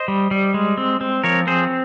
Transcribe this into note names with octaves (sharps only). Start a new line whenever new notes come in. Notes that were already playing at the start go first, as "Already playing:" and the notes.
Already playing: C5 D#5
G3
G3
G#3
C4
C4
F3 A#4 C#5
C4 G#4 C5